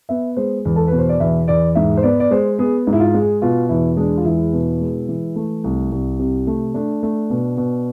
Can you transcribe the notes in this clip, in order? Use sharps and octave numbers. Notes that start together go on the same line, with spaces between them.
B3 E5
G#3 C5
E2
A4
B2 B4
C5
D5
E2 E5
E2 D5
G#2 E5
C5
B3 D5
D5
G#3 C5
B3 G#4
G#2
E4
F4
G#3
G#4
B2 F4
E2 E4
G#3 D4
F4
E2 E4
B2
G#3
E3
A3
C2
C2
C3
A3
A3 D4
A3
B2
B2